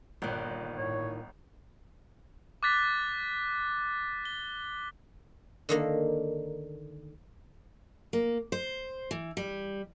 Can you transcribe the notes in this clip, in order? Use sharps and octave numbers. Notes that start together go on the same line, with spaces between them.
G1 A#2 D#3 F#6
A2 C#5
D6 F#6 A6 B6
G7
D3 D#3 A#3
A#3
C5
E3
G3